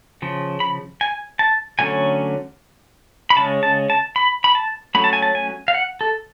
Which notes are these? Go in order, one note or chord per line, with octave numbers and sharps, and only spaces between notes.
C#3 F3
B5
G#5
A5
D3 F#3 A3 C#4 G#5
B5
C#3 G#3 C#4 A5
A5
A5
B5
B5
A5
F#3 A3 C#4 B5
A5
G#5
A5
G#5
F5
F#5
A4